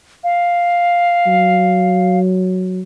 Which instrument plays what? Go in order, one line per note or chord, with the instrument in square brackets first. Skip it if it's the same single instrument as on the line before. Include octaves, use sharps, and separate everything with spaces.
[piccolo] F5
[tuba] F#3